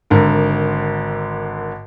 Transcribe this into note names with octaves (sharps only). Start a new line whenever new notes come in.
G#1 D3 A#4